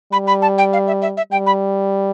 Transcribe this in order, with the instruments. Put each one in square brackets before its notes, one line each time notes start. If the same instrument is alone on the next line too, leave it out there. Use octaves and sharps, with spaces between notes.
[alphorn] G3 [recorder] B5
[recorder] B5
A5
G5
F5
E5
E5
E5
[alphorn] G3 [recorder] G5
[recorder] B5